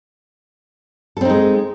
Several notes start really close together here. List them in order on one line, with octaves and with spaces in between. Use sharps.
A4 C4 D#4 G#3